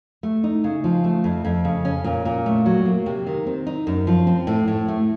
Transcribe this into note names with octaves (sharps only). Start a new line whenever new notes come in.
A3
D#4
C#3
F3
A3
F2
F2
C#3
C#4
A#2
A#2
A3
F#3
A#3
C3
D#3
C4
D#4
F#2
F3
C4
A2
A2
A3